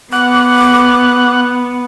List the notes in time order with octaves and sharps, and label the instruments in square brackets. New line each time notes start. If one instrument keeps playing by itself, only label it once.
[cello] B3 [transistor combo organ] F#5 [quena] D6